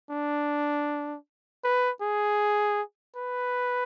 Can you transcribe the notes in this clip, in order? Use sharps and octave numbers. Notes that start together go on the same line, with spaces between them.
D4
B4
G#4
B4